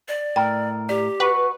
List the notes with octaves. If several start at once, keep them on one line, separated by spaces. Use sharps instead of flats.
D5
A2 A#4 G5
G4 D5
F#4 B4